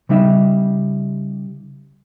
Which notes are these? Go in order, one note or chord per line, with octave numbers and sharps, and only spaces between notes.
C#3 G3 D#4 E5